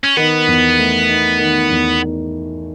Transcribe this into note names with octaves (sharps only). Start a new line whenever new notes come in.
C#4
D#3 B3
E2
A3
D#4
D#3
E2